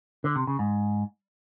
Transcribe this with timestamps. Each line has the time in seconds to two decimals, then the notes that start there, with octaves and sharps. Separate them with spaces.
0.24 D3
0.36 C3
0.47 C#3
0.59 G#2